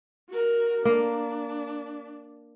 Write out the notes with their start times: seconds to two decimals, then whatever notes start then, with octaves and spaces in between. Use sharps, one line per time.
0.30 F#4 A#4
0.85 A#3 D4